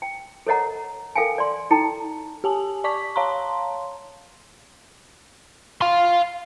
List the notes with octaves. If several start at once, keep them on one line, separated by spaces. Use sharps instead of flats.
G5
A4 A#4 C#5 D#5 F#5 A#5
A4 A#4 F5 G5 G#5
D5 C6
D#4 A4 G5 A5 A#5
G4 G#5 A5
D5 A5 C#6 D6 B6
C#5 F5 A5 A#5 C6
F5 C6